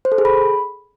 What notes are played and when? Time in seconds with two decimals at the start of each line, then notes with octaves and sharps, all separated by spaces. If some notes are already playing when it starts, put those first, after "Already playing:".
0.05 C5
0.12 A4
0.18 G#4
0.25 B5